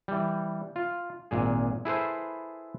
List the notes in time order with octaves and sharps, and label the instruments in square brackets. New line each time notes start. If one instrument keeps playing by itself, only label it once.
[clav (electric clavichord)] E3 G3
F4
G#1 A#2 G#4
E4 G#4 A4 B4 C5